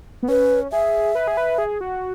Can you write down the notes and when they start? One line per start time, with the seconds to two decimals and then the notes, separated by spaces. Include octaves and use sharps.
0.23 B3
0.28 C#4 B4
0.72 G#4 E5
1.15 B4
1.27 G#4
1.37 B4
1.58 G#4
1.81 F#4